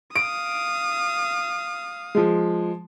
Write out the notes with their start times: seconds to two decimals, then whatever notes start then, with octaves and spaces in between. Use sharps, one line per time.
0.16 F5 D#6 D7
2.15 F3 G#3